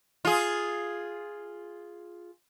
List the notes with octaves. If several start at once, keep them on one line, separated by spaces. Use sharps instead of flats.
F4 G#4